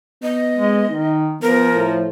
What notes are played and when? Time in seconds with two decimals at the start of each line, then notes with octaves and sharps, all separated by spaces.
0.23 B3 D#5
0.57 G#3
0.89 D#3 D#4
1.42 F3 B3 A#4
1.74 A2